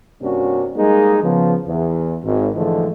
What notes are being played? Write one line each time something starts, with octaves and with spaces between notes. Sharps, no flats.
G2 C3 A#3 C#4 D4 F#4
G3 G#3 A#3 D#4 G#4
C#3 F3 B3
E2
G#1
G#2 D3 E3 F3 G#3 A3